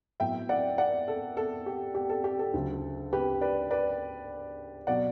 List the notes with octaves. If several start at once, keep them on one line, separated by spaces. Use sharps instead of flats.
A2 F#3 B3 E5 G5
D5 F#5
D5 F#5
A4
A4
G4
G4
A4
G4
A4
D2 C#3 F#3
G4 B4
B4 D5
B4 D5
B2 F#3 D5 F#5